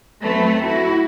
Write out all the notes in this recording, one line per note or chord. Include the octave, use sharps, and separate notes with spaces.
F#3 A3 C4 C#4 B4
E4 F#4